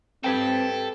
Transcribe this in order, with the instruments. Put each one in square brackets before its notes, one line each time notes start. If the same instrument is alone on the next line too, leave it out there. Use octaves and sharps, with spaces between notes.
[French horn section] C4 [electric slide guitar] G4 B4 G5 [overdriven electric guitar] A4